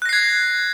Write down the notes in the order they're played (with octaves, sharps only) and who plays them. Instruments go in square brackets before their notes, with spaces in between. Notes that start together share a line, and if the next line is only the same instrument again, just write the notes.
[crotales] F#6
A#6
C7
G#6